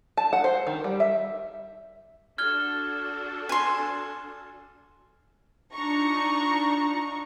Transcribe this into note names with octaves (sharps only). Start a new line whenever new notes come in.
A5
F#5
C5
D#3
G3
E5
D4 F#4 A4 F6 G#6 G7
G#5 C6
D4 D#4 F4 A#5 C#6